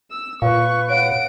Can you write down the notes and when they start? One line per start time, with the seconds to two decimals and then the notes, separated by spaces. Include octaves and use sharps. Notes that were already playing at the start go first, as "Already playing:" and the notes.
0.11 E6
0.42 A#2 B4 F5 C#6
0.90 C#5 F5 F#5 D7